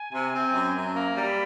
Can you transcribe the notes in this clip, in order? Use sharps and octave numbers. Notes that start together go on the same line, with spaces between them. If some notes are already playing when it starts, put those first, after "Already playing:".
Already playing: G#5
C3
C4
F#2
F#2
A5
A#3 A#5
G3 A#5
B5